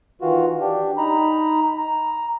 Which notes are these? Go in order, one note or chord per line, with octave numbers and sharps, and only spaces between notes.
D#3 E3 F4 F#4
D4 G4
D#4 A#5 B5
A#5